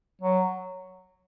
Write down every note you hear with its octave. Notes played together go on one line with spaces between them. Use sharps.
F#3